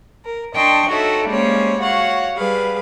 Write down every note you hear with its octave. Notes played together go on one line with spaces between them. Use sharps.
A#4
D4 D#5 G5 A5 C6 C#6
D#4 F#4 A4 C#5 E5
G3 G#3 A#3 C#4 C5 C#5
F#4 C#5 F5 F#5
G3 G#4 B4 F5